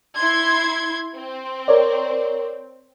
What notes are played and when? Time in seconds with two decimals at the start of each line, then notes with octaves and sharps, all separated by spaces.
0.16 E4 C6 G#6
1.15 C4
1.68 A#4 C#5 D5